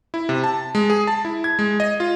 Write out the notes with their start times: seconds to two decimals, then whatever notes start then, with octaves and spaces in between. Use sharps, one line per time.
0.14 E4
0.29 C3
0.44 A5
0.75 G#3
0.90 G#4
1.07 A5
1.25 E4
1.44 G#6
1.59 G#3
1.80 D#5
2.00 F4